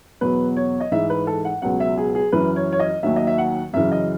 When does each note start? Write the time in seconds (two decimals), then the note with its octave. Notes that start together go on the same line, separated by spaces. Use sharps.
0.21 E2 B2 F#3 B4
0.56 C#5
0.80 D#5
0.92 G#2 E3 E5
1.10 B4
1.27 A4
1.45 F#5
1.62 C#2 B2 F#3 F#5
1.80 E5
1.97 G#4
2.15 G#4
2.32 F#2 E3 B4
2.56 C#5
2.72 C#5
2.79 D#5
3.03 D#2 D#3 F#3 E5
3.16 D#5
3.27 E5
3.38 F#5
3.73 F#2 C#3 E3 E5
3.92 D#5